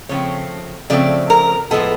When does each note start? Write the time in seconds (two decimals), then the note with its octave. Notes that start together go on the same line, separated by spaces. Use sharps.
0.09 C#3 F3 A3 C4 C#5
0.90 C#3 F3 A3 C4 D5
1.30 A#4
1.71 A2 F3 G#3 B3 A4